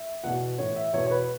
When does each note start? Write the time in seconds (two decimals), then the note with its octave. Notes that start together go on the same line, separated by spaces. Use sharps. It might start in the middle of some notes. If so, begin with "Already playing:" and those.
Already playing: E5
0.24 E2 B2 F#5
0.58 A2 E3 C#5
0.76 E5
0.93 E2 B2 C#5
1.06 C#5
1.11 B4